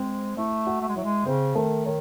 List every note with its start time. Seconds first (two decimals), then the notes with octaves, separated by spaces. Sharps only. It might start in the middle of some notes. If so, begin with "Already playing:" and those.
Already playing: G#3 C4 C5
0.37 A3 E4 E5
0.67 F#4 F#5
0.81 A3
0.89 G#3
0.96 F#3 E4 E5
1.03 G#3
1.26 C#3 C4 C5
1.55 D#3 A3 A4
1.85 D#3 C#5